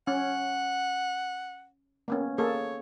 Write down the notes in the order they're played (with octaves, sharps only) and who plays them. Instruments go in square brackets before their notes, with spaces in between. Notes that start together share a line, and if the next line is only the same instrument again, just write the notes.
[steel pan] C#4 [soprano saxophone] F#5
[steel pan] A#3 B3 C#4
[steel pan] A#3 G#4 A4 [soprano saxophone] C#5